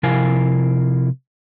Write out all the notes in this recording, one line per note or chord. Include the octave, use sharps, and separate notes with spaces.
C3 F3 E4 A#4 F5 G#5